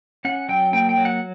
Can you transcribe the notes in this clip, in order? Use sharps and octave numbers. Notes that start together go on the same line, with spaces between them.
C#4 F#5
F#3 G5
A#3 G5
G5
F#3
F#5